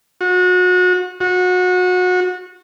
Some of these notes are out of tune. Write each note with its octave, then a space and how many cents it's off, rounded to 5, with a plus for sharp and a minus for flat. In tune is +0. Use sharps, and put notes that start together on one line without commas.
F#4 -30
F#4 -25